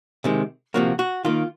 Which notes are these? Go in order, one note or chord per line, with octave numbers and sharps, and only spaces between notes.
C3 D#3 G#3
C3 F3 A#3 F#4
F#4
D#3 A#3 F4